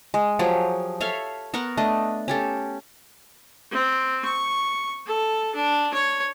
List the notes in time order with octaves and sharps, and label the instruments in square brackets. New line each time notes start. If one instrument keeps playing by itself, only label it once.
[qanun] G#3
F3 F#3 G4 G#4
A4 C#5 E5 F5
B3 A#4 F#5 C#6
A3 D4 D#5
C#4 G4 A4
[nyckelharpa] C4
C#6
A4
D4
C#5